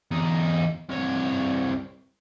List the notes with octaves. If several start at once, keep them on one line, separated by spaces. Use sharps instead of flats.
E2 D#4
C2 C#5